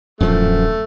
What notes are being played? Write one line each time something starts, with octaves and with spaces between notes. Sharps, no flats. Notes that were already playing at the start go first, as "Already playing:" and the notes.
D1 F#2 A#2 F3 A3